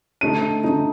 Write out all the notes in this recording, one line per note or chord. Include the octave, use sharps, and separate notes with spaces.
D3 A3 D#4 D#7
D3 A3 D#4